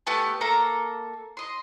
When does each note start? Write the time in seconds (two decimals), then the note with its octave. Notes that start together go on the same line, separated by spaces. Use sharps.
0.07 A3 B3 G4 A5
0.41 A#3 A4 E5 A#5
1.37 D#5 C6